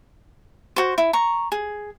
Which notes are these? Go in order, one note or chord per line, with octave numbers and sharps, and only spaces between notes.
F#4 C5
E4
A#5 C#6
G#4